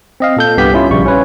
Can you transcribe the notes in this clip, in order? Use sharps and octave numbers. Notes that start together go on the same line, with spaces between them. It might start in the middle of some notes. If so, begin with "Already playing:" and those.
C4 D#5 F5
A#2 A4 G6
C2 G2 B3 G4 B6
C#4 E4 F4
A#1 C#3 G3 C#6
C#4 B4 C#5